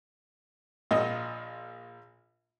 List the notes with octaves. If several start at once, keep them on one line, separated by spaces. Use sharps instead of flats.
A#1 A#2 D#5